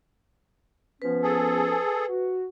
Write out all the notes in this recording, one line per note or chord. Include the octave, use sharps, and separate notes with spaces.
F3 B3 C#4 B4
G#4 A4
F#4